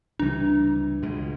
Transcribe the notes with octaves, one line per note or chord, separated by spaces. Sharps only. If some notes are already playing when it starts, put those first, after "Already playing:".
C#2 C3 E3 G3 D4
C#2 B2 G#3